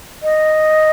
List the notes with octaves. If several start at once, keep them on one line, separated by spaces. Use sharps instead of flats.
D#5